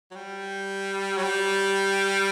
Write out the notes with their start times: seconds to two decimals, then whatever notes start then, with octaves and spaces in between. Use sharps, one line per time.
0.11 F#3
0.15 G3
1.17 F#3
1.23 G3